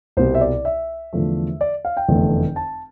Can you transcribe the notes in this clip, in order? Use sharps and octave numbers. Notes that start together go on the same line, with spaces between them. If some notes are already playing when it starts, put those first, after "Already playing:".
C2 B2 G3 C5
E5
D5
E5
E2 D3 F3 A3
D5
F5
G5
F1 E2 D3 A3
A5